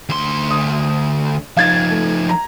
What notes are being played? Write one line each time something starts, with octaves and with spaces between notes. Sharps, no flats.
D2 C6
D#6
F3 D#4 F5 G#6 A6
A3
A#5